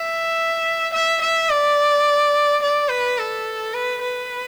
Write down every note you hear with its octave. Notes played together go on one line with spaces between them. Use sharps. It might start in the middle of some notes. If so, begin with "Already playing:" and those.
Already playing: E5
E5
E5
D5
D5
B4
A4
B4
B4